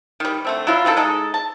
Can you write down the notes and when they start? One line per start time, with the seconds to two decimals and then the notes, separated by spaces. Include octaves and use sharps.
0.20 D#3 G3
0.45 D3 A3 C4
0.67 F#3 E4 F4
0.85 C3 D#3 C4 A4
0.97 G#3 D#4 A4
1.34 A5